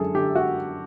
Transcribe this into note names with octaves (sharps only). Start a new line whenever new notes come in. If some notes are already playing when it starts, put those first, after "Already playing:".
Already playing: F#2 D3 G#4 A4
D3 G4
F#4